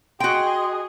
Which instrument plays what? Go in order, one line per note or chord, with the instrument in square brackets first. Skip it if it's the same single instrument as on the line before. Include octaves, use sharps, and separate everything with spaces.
[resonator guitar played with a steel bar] F#4 G5 [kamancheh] G#4 D#5 [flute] C6